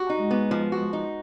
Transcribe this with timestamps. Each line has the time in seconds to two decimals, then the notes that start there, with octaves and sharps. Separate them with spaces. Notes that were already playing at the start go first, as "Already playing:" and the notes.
Already playing: F#4
0.09 D#4
0.21 G#3
0.31 B3
0.51 F3
0.72 F#4
0.93 D#4